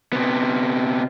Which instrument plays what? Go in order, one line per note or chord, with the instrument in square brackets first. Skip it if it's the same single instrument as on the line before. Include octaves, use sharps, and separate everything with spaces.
[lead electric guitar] C3 B3